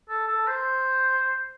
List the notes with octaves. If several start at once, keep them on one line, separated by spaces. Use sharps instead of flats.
A4
A4
C5